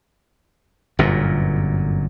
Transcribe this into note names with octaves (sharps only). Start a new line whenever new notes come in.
G1 F#2 A#2